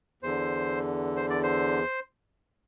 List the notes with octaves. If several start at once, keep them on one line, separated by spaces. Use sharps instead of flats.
E2 D3 C5
C5
D5
C5